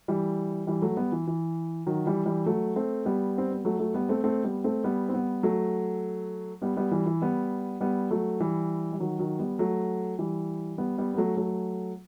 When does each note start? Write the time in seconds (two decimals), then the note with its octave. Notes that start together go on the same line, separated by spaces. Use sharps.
0.08 E3 G3
0.67 E3 G3
0.82 F#3 A3
0.97 G3 B3
1.12 E3
1.27 E3
1.86 D#3 F#3
2.06 E3 G3
2.26 E3 G3
2.46 F#3 A3
2.76 A3 C4
3.05 G3 B3
3.38 C4
3.51 B3
3.65 F#3 A3
3.79 F#3 A3
3.94 G3 B3
4.09 A3 C4
4.24 A3 C4
4.44 G3 B3
4.64 A3 C4
4.84 G3 B3
5.09 C4
5.13 G3 B3
5.43 F#3 A3
6.62 G3 B3
6.76 G3 B3
6.91 E3 G3
7.06 E3
7.22 G3 B3
7.81 G3 B3
8.11 F#3 A3
8.40 E3 G3
8.93 G3
9.00 D#3 F#3
9.19 D#3 F#3
9.39 G3 B3
9.59 F#3 A3
10.19 E3 G3
10.78 G3 B3
10.98 G3 B3
11.14 B3
11.17 F#3 A3
11.37 F#3 A3